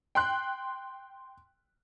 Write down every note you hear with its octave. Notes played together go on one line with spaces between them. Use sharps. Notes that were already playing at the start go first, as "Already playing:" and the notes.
G5 C6 F#6